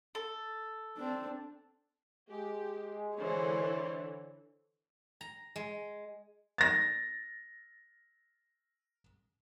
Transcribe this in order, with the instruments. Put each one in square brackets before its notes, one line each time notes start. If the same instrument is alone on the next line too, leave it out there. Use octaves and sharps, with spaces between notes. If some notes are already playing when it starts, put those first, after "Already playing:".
[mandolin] A4
[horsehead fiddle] C4 D4
[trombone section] G#3 [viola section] G4
[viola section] D3 E3 [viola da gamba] C5 C#5
[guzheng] A#5
G#3
[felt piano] A6 A#6